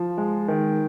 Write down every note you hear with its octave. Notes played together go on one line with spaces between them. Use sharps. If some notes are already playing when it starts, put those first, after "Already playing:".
Already playing: F3
G#3
D#3